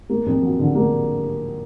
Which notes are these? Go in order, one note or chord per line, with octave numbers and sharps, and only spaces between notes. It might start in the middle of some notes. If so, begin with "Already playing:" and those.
A#3
F2
F#3
D3
A#3